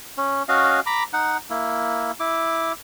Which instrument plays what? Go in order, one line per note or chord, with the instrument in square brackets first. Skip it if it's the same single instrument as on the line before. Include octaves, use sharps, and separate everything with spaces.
[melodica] C#4
C#4 F#4 D#5 F5
A#5 B5 D6
D#4 F#5
A#3 E4
E4 D6